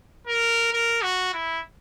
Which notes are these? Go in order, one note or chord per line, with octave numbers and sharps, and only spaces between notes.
A#4
A#4
F#4
E4